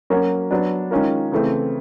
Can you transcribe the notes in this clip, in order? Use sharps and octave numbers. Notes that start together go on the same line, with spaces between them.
F#3 A#3 C#4 F#4 A#4
F#3 B3 D4
D#3 G#3 C#4 F4 A#4
C#3 E3 A3 C4